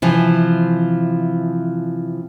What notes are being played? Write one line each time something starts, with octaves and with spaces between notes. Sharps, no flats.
C3 E3 F3